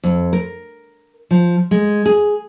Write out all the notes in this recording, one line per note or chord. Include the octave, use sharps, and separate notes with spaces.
F2
A#4
F3
G#3
G#4